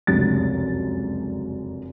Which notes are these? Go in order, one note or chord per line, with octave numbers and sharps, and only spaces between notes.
F1 C#2 F#2 D4 A6